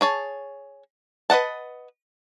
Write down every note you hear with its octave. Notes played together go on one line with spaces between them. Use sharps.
G#4 C#5 A5
B4 D#5 F#5 A5